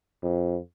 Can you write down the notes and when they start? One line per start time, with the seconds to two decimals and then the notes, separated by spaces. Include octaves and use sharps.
0.23 F2